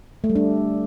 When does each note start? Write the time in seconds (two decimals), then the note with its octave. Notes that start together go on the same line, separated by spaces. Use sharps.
0.24 A3
0.30 G3
0.35 D4